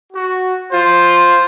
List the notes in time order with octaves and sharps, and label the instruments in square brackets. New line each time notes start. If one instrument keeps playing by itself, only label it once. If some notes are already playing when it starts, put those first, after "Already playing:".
[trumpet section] F#4
[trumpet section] F4 [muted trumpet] C5